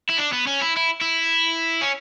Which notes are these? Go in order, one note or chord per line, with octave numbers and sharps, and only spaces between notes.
E4
D4
B3
C#4
E4
E4
E4
C#4